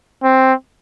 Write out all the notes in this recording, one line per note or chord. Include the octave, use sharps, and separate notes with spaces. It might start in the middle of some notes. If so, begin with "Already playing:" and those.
C4